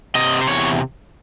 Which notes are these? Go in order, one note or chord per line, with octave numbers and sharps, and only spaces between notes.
C3 D#5
C5
E2 C#5